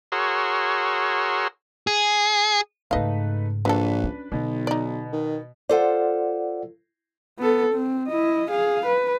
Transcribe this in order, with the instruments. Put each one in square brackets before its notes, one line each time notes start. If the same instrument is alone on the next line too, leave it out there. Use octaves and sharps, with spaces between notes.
[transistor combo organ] F#4 G#4 A#4 C#5 C6 E6
[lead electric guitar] G#4
[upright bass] G#2 C#3 [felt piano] A3 D#4 B4 [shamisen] D#5 F5
[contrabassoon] A#1 [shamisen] F#3 A4 [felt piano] D4 B4
[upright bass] C#4
[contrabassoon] B1 [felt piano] B2 [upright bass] D3
[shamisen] D#4 D5
[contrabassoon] D#3
[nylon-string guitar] F4 A4 C5 [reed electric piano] D5 F#5
[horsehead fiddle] B3 A4
C4
E4 D#5
G#4 F5
B4